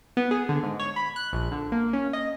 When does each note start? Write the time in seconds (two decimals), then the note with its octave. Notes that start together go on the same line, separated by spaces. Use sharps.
0.17 B3
0.31 G#4
0.49 D3
0.63 G#2
0.80 C#5
0.96 B5
1.16 F#6
1.33 A#1
1.52 D3
1.72 A#3
1.93 C#4
2.13 D#5